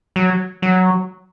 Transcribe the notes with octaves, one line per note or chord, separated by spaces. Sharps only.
F#3
F#3